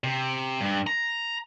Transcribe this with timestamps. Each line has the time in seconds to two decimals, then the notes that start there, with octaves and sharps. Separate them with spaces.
0.04 C3
0.61 G2
0.87 A#5